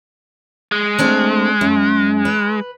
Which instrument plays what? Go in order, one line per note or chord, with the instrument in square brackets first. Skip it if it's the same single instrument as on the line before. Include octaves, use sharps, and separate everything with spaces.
[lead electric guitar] G#3
[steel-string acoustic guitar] A3 C4 D4
F#2
B4